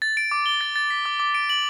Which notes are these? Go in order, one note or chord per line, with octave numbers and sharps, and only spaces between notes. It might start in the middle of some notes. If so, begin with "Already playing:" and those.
A6
D7
D6
G7
A6
A6
B6
D6
D6
D7
F#7